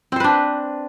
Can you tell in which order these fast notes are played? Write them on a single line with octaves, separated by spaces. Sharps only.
C4 C5 B4 D4